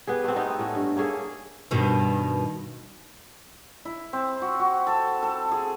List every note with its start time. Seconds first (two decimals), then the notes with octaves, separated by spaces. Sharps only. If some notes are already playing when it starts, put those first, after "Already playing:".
0.07 B3 G4 G#4
0.24 A3 C4
0.36 B3 C4 D#4
0.58 A2 A3 C#4
0.75 G2
0.97 A#3 C#4 G#4 A4
1.71 G2 B2 D#3
3.85 E4
4.13 C4
4.42 F#4
4.59 F#4
4.87 A4
5.23 A4
5.51 G#4